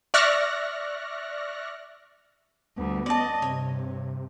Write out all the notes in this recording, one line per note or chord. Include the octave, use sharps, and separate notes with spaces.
D5 E5 C#6 F6 F#6 A#6
D2 G3 B3
C#4 D5 D#5 A5
G2 C3 C#5